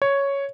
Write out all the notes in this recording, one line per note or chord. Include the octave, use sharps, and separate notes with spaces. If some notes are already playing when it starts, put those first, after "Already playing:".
C#5